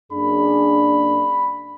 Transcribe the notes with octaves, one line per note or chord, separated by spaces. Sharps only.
F#2 A#3 D4 G#4 B5